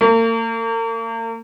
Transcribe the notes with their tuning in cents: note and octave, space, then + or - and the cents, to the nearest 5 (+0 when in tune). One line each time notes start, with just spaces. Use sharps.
A#3 -40